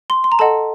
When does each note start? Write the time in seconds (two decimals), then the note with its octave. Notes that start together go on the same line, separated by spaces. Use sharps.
0.10 C6
0.24 C6
0.32 A#5
0.39 A4 D#5 F#5 A5